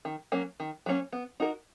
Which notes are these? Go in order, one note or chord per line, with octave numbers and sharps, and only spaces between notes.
D#3
F#3 A#3 C#4
D#3
F#3 A#3 C#4
B3
D#4 F#4 A#4